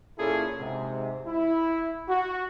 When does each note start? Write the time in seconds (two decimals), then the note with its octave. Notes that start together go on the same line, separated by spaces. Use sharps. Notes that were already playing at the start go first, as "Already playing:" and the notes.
0.18 A#2 C#4 E4 G#4 A4
0.59 G#2 C3
1.27 E4
2.08 F#4